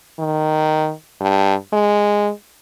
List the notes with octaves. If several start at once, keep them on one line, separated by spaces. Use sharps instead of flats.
D#3
G2
G#3